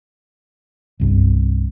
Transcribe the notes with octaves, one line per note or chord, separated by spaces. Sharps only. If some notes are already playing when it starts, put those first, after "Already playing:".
G1 C2 G2